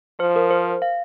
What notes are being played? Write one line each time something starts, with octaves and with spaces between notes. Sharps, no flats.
F3 C5
A#4
C5
F5